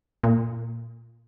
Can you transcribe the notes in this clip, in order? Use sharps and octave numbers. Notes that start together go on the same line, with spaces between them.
A#2